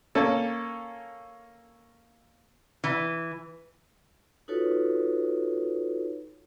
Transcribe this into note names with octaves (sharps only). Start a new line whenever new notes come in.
A#3 C#4 A4
E3
D#4 F4 F#4 A4 B4 C#5